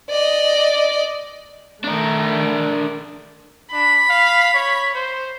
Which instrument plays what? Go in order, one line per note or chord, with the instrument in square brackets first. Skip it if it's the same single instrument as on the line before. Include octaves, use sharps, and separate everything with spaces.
[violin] D5 D#5
[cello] D#3 A3 [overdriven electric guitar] D4 A#4
[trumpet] D4 [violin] B5
[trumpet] F5
C#5
C5